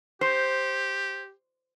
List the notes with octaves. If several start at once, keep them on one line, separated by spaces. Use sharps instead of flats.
G4 C5